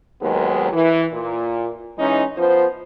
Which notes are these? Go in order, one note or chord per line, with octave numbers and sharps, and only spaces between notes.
D#2 G#2 F#3 G#3 B3
E3
A#2
E3 G#3 C#4 D#4
F3 B3 C5